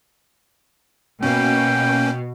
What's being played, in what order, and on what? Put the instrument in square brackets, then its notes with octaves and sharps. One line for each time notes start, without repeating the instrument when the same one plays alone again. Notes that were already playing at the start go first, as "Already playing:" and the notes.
[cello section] B2 [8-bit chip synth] A#3 C#4 [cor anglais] G5